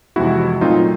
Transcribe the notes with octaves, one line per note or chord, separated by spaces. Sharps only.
F2 C3 E3 G#3 B3 E4 F#4
A#2 F#3 A3 C4 D#4 F4